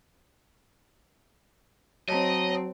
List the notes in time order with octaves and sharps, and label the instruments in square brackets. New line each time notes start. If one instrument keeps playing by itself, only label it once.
[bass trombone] F#3 [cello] C4 [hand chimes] C#5 A5 A#5 [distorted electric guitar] D#5